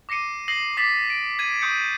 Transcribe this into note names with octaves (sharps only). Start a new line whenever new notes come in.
D6 A#6 C7 C#7 D#7
D#6 A#6 C7 F#7
D6 D#6 A6 B6 F#7
D7
G#6 D#7
C#6 D#6 G6 C#7